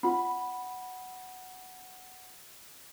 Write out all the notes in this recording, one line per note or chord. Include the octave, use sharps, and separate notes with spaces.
C4 F4 F#5 B5